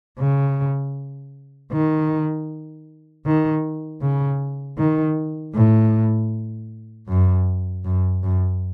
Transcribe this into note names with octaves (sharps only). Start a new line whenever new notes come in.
C#3
D#3
D#3
C#3
D#3
A2
F#2
F#2
F#2